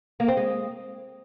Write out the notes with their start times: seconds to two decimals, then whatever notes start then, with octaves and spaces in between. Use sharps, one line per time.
0.20 A#3
0.28 C4
0.37 G#3